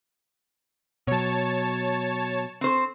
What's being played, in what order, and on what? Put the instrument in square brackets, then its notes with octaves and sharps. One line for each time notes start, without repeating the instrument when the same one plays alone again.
[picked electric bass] B2 F#3 [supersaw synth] C#5 A5
[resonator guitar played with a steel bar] C4 C5